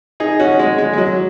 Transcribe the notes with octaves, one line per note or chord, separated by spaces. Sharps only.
D#4 G#4
C#4 F#4
G#3
G#3
G#3
F#3